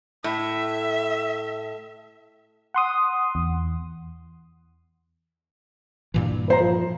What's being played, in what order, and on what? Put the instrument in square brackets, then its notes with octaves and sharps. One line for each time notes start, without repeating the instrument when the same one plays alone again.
[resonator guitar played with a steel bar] A2 [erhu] E5
[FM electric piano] F#5 C6 D#6
E2
[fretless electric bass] G2 A#2 E3
[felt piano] B4 C5 A#5
F3